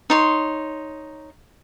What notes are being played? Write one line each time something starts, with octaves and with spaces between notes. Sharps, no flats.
D#4 C#5 C6